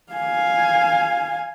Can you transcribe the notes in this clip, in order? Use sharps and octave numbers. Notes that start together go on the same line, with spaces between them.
F5 G#5